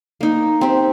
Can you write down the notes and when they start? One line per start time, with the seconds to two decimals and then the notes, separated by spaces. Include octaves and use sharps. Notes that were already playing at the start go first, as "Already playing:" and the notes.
0.21 A#3 D#4
0.61 C4 G4